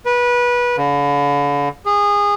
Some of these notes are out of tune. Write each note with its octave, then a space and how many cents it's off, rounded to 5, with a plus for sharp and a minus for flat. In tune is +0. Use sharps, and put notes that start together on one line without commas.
B4 -25
D3 -45
G#4 -25